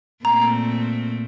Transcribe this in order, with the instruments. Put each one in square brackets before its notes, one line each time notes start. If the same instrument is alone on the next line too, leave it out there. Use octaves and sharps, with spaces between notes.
[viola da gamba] A#2 A3 C4 [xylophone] A#5